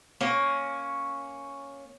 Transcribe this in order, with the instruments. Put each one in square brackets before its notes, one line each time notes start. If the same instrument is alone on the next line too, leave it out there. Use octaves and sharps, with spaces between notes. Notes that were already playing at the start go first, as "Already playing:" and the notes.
[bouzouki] A#3 C#4